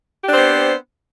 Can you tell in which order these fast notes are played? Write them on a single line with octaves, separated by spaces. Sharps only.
G4 D4 C4 C5 B3